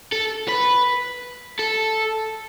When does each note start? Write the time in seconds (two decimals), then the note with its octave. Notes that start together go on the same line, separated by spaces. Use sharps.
0.12 A4
0.49 B4
1.59 A4